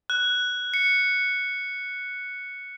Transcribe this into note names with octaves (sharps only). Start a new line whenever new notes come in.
F#6
C#7